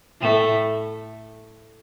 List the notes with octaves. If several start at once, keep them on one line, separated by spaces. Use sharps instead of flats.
A2 A3